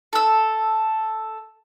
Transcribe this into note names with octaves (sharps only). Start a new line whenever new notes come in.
A4 E6